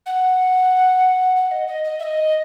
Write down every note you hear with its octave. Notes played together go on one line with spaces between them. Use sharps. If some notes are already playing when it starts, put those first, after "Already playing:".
F#5
F#5
D#5
D#5
D#5
E5
D#5